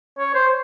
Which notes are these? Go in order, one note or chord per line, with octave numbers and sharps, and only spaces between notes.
C#5
C5